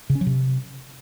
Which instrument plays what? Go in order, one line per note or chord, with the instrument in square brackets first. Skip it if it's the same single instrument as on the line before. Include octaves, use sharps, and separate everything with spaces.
[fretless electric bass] C#3
C#4
F#3
C3